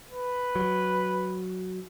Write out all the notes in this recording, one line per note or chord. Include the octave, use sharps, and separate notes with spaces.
B4
F#3